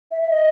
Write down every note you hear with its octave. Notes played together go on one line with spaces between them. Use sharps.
E5
E5
D#5